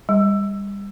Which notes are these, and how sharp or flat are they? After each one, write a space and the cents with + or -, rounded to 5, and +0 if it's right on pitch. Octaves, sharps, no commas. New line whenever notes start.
G3 +35